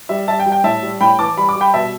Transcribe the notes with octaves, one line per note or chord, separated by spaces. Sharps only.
G3 E5
G3 E5 A5
G5
G3
G5
A2 E5 A5
G3
A2 G5 B5
E3 A5 D6
G3 B5
D6
G3
G5 B5
B2 E5 A5